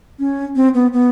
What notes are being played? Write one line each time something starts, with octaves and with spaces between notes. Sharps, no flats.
C#4
C4
B3
B3